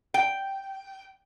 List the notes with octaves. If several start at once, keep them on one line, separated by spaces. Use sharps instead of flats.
G5